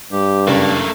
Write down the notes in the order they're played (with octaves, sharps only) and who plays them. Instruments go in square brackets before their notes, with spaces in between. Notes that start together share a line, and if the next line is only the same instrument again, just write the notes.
[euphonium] G2 [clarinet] G4
[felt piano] F#1 [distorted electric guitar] A3 A#3 [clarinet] D4